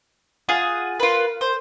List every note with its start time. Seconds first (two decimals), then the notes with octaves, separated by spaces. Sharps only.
0.49 F4 G#4 F#5
1.00 F4 A#4 B4
1.41 C5